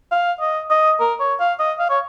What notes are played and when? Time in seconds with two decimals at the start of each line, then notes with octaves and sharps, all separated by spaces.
0.12 F5
0.40 D#5
0.70 D#5
1.00 A#4
1.20 C#5
1.40 F5
1.59 D#5
1.79 F5
1.89 C#5